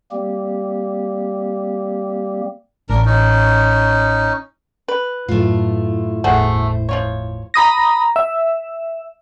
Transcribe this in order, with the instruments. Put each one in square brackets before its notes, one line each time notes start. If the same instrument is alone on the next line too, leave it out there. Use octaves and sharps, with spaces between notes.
[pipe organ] G3 A#3 C4 G4
[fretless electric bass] A1 [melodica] D4 A#4
[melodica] C#4 D#4
[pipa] B4
[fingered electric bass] F#2 A2 [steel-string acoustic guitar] A3 F4 [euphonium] E4
[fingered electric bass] G1 E2 A2 [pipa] A3 F#4 G#4 [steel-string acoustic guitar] C5
[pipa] F3 F4 C#5
[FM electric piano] A#5 B5 D#6 A#6
E5